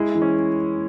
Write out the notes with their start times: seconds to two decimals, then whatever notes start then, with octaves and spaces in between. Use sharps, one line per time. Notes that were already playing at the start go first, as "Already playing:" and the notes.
Already playing: G#3 E4
0.15 E3
0.22 C#4